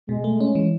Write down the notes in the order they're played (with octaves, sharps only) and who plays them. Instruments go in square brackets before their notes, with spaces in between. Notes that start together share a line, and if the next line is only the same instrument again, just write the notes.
[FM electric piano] B2 [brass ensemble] G#3
[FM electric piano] A3
C#4
E3